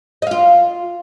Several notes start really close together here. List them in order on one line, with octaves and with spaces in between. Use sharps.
D#5 F5 F4